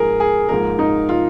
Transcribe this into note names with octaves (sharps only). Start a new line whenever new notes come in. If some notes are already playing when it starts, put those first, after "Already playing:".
Already playing: G#2 F3 A#3 G#4 A#4
G#4
G#2 F3 A#3 A#4
D#4
F4